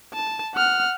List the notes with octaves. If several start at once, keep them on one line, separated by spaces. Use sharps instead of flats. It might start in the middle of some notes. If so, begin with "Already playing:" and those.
A5
F#5 F6